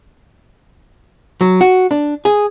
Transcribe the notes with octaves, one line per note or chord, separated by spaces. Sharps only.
F#3
F#4
D4
G#4